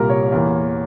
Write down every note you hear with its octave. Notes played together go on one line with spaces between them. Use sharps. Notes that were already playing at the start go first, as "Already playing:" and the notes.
Already playing: C2 A#2 G3 A#3 A#4
C#5
E2 E3 A#3